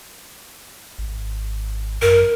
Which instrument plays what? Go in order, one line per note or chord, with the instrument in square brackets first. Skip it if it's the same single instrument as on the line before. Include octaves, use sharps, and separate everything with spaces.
[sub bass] G#1
[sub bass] F#2 [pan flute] A#4